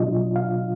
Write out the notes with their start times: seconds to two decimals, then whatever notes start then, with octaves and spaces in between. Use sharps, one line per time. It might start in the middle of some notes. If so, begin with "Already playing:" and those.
Already playing: B2 F#3 D4 F4 D#5
0.36 F5